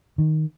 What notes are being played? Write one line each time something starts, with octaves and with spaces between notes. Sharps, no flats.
D#3